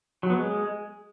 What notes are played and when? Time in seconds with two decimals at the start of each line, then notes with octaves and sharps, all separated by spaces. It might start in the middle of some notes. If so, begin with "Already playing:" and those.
0.23 F#3
0.30 B3
0.36 G#3